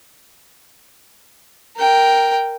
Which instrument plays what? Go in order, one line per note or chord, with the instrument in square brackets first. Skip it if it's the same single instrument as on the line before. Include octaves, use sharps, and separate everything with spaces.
[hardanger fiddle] A#4 G5